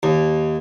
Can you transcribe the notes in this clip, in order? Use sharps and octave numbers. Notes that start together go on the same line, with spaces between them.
D#2